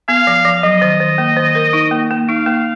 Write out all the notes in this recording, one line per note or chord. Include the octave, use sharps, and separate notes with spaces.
B3 F5
F3
F3
F#3 D#5
D#3
D#3
A#3
D#3
A#4
D#4
A#3
A#3
D#4 F5
A#3